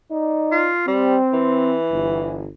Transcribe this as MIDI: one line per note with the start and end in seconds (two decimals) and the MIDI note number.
0.11 0.70 63
0.11 0.70 74
0.52 0.85 65
0.88 1.16 55
0.88 1.76 60
1.33 2.48 52
1.92 2.49 31